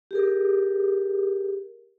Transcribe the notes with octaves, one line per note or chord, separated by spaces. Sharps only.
G4 G#4 A#4